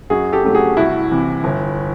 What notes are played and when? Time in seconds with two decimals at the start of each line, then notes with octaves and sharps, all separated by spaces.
0.10 F#2 F#4 G#4
0.33 G4 A4
0.44 C#3 F#3 A3
0.55 F#4 G#4
0.77 C2 E4 F#4
1.11 C3 E3
1.44 G1